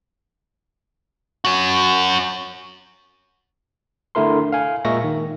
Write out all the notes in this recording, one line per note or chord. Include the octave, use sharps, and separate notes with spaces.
C#4 F#4
D3 A3 E4 A#4 C6
F5 G#5
A#2 G#3 A#4 E5 C#6 A#6
D#3